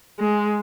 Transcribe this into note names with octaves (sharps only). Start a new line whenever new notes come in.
G#3